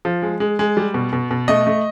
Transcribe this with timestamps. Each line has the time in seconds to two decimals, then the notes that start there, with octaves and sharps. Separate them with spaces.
0.05 F3
0.22 G#3
0.40 G#3
0.59 G#3
0.77 G3
0.94 B2
1.13 B2
1.31 B2
1.48 A3 D#5
1.67 A3